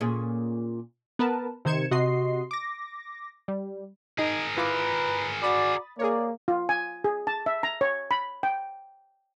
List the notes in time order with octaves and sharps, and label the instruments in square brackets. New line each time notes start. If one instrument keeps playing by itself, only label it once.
[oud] A#2 C#4 G#4
[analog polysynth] B3 A#4 B4 A5
C3 D#3 C5 G#6 C#7 E7
C3 F#4 D#5 C6 C7
D6 A#6
G3
[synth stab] D#4 D#5 [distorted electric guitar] G#4 A#4
[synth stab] E4 F4 D6 [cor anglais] B4
[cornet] F#4 [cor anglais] D5 [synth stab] B5 D#6 A6
[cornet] A#3 [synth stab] G#4 A#4 C#5 [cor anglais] D5
[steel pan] F4
G#5
G#4
A5
E5
A#5
C#5
B5
G5